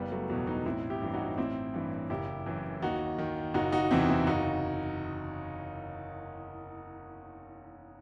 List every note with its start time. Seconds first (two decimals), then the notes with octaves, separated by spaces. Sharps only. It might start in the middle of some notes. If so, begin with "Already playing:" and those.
Already playing: F#1 G3 B3
0.11 F#3 A3
0.29 E2 B2 F#3
0.47 B3 D#4
0.66 A1 C4 E4
0.90 E4 G4
1.02 G2 E3
1.14 D#4 F#4
1.38 A1 C4 E4
1.74 G2 E3
2.10 F#1 E4 G4
2.46 F#2 E3
2.82 D#2 D#4 F#4
3.18 D#3
3.54 F#1 D#4 F#4
3.72 D#4 F#4
3.91 E2 C3 E3 C4 E4
4.09 C4 E4
4.27 F#1 D#4 F#4